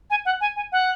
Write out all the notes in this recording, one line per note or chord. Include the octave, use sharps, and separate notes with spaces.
G#5
F#5
G#5
G#5
F#5